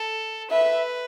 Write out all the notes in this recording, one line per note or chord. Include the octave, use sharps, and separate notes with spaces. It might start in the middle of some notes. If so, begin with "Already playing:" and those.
Already playing: A4
B4 E5